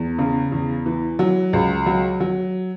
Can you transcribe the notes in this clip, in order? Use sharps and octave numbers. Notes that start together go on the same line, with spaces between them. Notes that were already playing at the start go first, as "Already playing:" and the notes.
Already playing: E2
C#3
E2
E3
F#3
C#2
F#3
F#3